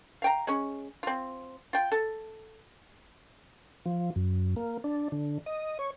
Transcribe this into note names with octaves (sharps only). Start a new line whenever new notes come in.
F5 G5 A#5
G#3 C#4
C4 F4
F4 G5
A4
F3
F#2
A#3
D4
D3
D#5
C#5